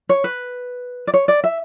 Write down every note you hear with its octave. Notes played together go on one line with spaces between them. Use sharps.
C#5
B4
D5
C#5
D5
E5